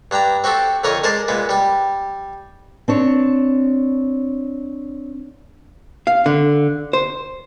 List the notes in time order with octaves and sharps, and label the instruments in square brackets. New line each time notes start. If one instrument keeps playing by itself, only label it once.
[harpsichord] G2 D4 G5 A#5
C4 F#4 G4 A4
F2 D3 A#4 C#5 D#5
G#3 A#4 C5 D5 A5
A#2 G#3 B3
G3 G4
[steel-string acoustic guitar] C4 D4 C#5
[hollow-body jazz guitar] F5
D3
C5